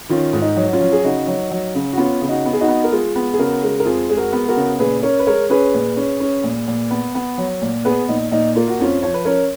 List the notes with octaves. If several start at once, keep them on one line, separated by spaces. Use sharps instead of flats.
D#3 C#4 F4
G#2 F4
D#4
F#3
F#4
C#4 F4
F#3
G#4
C#3 D#4 F#4
F#3
F#3
C#3
F#4
B3 C#4 F4
C#3
D#4 F#4
B3
G#4
D#4 F#4
B3
A#4
G#3 F4 G#4
B3
G#4
C#3 F#4 A#4
G#3
A#4
F2 F4 G#4
G#3 G#4
F#4 A#4
B3
F#4 A#4
C#3
A#2 G#4 B4
C#4 A#4 C#5
B4
G#3 A#4 C#5
C#4 G#4 B4
A#2
C#4
C#4
A#2
A#2
B3
B3
F#3
A#2
B3 G#4 B4
A#2 D#4
A#2 D#4
A#3 F4
F#4
F2 C#4 F4
F3 C#5
B4
C#4 A#4 C#5